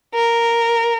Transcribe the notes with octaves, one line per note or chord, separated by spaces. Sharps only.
A#4